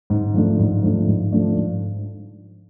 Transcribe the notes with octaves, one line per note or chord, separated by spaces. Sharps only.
G#2
F3 A3 D4
G#2
F3 A3 D4
G#2
F3 A3 D4
G#2